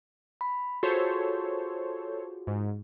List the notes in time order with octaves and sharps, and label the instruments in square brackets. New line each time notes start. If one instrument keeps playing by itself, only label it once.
[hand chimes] B5
[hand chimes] F4 F#4 G#4 [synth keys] A4 C5 C#5
[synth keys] G#2